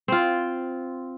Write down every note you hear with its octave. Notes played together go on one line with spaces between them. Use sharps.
C4 F4